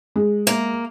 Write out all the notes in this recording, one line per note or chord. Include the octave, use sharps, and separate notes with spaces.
G#3
A#3